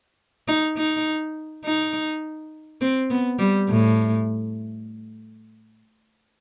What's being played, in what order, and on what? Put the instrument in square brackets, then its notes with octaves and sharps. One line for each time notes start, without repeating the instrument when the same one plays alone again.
[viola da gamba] D#4
D#4
D#4
C4
B3
G3
A2